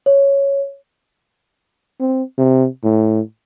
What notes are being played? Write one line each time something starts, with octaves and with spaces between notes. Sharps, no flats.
C#5
C4
C3
A2